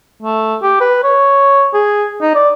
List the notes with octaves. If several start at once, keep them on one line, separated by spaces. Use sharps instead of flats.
A3
G4
B4
C#5
G#4
D#4
D5